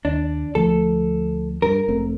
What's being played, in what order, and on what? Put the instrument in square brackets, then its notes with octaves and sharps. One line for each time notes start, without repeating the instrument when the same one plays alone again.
[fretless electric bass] D#2 [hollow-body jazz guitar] D4
[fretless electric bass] D2 F3 A3 [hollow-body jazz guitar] A4
[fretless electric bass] G2 [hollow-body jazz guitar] A#4
[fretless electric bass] F1 A3 C4